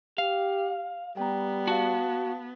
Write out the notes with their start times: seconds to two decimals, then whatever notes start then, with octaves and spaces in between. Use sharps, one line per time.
0.18 G4 F5
1.17 G3 B3 G5 A#5
1.67 F#4 F5 A5